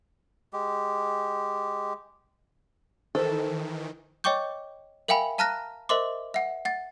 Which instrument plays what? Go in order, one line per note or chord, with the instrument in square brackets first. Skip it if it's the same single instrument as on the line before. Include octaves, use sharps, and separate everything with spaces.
[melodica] G#3 G4
[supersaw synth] D#3 E3 [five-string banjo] A4 [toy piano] A#4 C5 E6
[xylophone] C#5 D#5 G5 C#6 D6 G6
A#4 E5 F5 G5 G#5 B5
F5 A5 A#5 F6 F#6 A#6
A#4 C5 D#5 E5 C6 D6
E5 F#5
F#5 A6